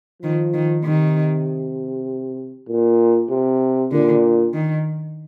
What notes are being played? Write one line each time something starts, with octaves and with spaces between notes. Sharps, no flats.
D#3 F3
D#3
C3 D#3
A#2
C3
A#2 D3
D#3